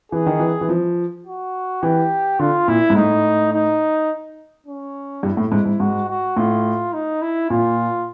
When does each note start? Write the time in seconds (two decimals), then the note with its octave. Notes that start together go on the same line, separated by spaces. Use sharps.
0.12 E3 G#4
0.26 D#3
0.39 E3
0.61 E3
0.69 F3
1.26 F#4
1.82 E3 G4
2.39 D3 F4
2.68 A#2 E4
2.90 G#2
2.96 A2 D#4
3.53 D#4
4.66 C#4
5.23 G2 E4
5.37 A2
5.52 G#2
5.66 G#2
5.80 G#2 F#4
6.08 F#4
6.37 A2 F4
6.93 D#4
7.22 E4
7.50 A#2 F4